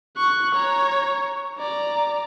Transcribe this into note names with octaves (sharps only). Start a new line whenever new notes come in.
C#6 F#6
C#5 A#5
D5 A#5